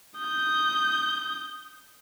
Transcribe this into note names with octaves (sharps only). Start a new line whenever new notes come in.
D#6 G6